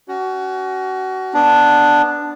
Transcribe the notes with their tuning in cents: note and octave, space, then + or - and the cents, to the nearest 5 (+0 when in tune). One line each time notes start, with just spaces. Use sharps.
C#4 +20 F#4 +25
B3 +0 D4 +5